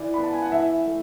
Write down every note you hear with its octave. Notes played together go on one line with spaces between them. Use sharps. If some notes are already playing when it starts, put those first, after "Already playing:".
Already playing: E3 D5
B3 B5
A5
G#5
F#5
E3 E5
A3